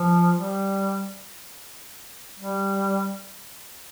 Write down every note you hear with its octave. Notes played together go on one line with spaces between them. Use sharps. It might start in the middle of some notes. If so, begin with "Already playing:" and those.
Already playing: F3
G3
G3